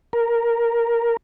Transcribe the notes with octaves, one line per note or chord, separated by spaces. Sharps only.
A#4